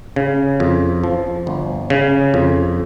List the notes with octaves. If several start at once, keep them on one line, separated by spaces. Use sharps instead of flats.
C#3
F2
F3
G1
C#3
F2